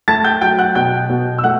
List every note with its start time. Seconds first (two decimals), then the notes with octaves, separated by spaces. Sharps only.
0.08 A3 A5 A6
0.24 G5 G6
0.41 F#3 G5 G6
0.59 F#5 F#6
0.75 B2 G5 G6
1.09 B2
1.38 E6
1.44 A3 F#5 F#6